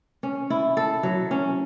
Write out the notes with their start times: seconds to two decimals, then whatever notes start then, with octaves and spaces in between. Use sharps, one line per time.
0.23 C#4
0.50 E4
0.77 A4
1.03 F#3
1.31 C#4